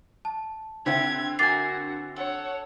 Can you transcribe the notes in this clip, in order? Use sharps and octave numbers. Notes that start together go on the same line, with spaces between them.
A5
D3 C4 E4 G4 F#5 G#6
A#3 F#4 G#5 D6 A6 C7
A4 C#5 F#5